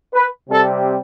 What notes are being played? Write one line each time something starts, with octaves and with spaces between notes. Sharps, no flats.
B4
C3 G3 C4 A4